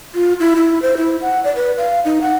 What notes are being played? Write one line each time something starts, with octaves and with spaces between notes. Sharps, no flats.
F4
E4
E4
C5
E4
F#5
D5
B4
F5
D#4
F#5